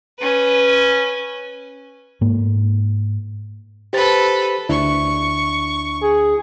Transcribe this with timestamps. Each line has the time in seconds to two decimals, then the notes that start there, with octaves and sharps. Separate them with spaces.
0.19 C#4 B4
2.21 G#2 A#3
3.93 G4 A4 B4 C5 A6
4.69 D2 D4 E4 C#6
6.03 G#4